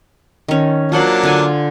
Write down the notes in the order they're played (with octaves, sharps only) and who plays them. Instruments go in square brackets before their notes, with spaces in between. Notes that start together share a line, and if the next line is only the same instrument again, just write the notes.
[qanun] D#3 C#4
[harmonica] F#3 A#3 D4 [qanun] F4 C5 F#5
[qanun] D3 F4 G#5